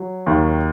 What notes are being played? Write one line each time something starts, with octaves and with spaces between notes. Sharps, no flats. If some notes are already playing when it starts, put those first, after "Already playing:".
Already playing: F#3
D#2 D#3